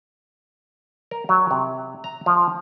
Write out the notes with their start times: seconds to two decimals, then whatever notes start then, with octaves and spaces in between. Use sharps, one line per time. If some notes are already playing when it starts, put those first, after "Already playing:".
1.11 A#4
1.29 F#3
1.51 C3
2.04 A#5
2.26 F3